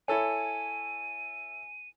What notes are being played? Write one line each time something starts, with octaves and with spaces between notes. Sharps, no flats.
E4 A4 C#5 G#5 D#7